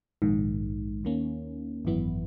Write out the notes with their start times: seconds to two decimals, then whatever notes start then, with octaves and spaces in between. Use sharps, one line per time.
0.22 A#1 G#2 D#3
1.04 D#2 D#3 A#3 C#4
1.85 G#1 F#2 E3 B3 E4